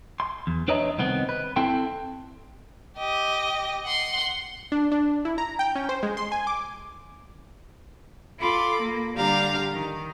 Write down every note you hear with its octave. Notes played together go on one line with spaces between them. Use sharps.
C6
E2
D4 B4 C#5 D#5 E5 A#5
C2 D#3 B3 C4 D#4
B4
C4 E4 A4 G5 C6
G4 D#5
F#5 C6
D4
D4
E4
A#5
G5
C#4
C5
G#3
C6
G#5
D6
F4 A4 B5 D6
A#3
D3 G3 D4 G4 F5 A#5
D#3